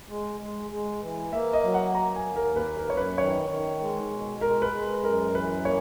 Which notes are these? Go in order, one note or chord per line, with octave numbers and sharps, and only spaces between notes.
G#3
G#3
G#3
E3
A#3 E5
D#5
F#3
F#5
A#3 A#5
G#5
D#2
A#4
A#3 B4
A#4
F#2 C#5
B4
D#3 C#5
D#3
G#3
B2
G#3 A#4
B4
G#3
F#2 A#4
E3 B4
A#3 C#5